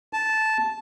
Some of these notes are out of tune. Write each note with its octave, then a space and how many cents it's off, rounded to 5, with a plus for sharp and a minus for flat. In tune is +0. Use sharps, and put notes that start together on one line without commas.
A5 -10